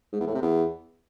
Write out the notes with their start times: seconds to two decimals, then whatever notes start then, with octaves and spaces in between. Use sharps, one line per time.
0.13 G#2
0.20 E2
0.27 A2
0.34 C3
0.42 E2